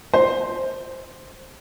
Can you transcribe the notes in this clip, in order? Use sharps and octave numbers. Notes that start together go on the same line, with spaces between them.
C5